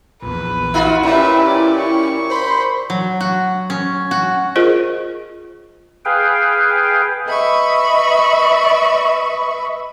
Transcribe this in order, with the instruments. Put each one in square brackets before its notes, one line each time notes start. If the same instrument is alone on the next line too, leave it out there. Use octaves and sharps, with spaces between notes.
[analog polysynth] A#1 E2 [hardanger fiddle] B4
[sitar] D#4 F4 F#4
[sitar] A#2 [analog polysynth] C#4 E4 G4 [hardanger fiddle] B4 E5
[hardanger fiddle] D5
C#6
[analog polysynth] C5 B5 C6
[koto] F#3
F#4
C#4
F#4
[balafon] F4 G#4 A#4 C5 D#5
[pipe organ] G#4 B4 F5 G5
[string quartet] B4 D#5 E5 B5 C#6